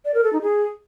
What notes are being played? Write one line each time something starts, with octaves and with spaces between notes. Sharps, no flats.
D5
A#4
A4
D#4
G#4